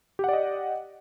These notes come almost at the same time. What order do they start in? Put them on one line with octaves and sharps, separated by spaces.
G4 F#5 D5 D#5